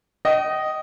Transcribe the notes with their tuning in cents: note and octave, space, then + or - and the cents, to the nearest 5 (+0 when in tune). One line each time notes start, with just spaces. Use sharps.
D#5 +0 G5 -40